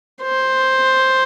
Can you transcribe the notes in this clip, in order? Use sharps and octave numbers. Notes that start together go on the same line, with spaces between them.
C5